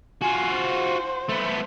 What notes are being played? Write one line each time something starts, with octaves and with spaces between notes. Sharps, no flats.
F4 F#4 G#5
C5
A3 B3